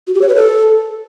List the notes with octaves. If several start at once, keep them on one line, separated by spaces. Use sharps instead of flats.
F#4
G4
C#5
B4
A4